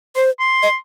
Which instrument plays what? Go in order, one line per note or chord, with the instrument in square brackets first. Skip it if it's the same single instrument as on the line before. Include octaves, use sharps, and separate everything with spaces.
[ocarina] C5 [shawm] C6
[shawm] C6
[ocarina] D#5